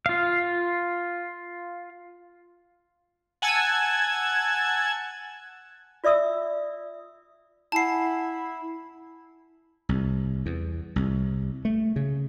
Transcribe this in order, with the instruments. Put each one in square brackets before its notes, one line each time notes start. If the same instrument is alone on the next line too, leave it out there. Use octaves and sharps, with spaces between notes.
[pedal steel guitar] F4 F5
[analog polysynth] F#5 G#5 A5 E6 G#6
[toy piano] F4 D5 E5 D#6 E6
[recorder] E4 [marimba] F#5 G#5 [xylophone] A5 C7
[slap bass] C2
E2
C2
A3
C#3